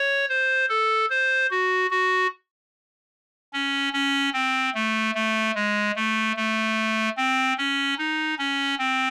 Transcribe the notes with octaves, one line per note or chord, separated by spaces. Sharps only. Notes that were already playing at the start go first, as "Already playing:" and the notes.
Already playing: C#5
C5
A4
C5
F#4
F#4
C#4
C#4
C4
A3
A3
G#3
A3
A3
C4
C#4
D#4
C#4
C4